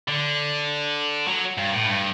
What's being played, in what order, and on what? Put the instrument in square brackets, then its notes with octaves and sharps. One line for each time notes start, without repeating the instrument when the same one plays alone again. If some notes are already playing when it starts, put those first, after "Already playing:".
[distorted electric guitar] D3
F#3
G2
A2
G2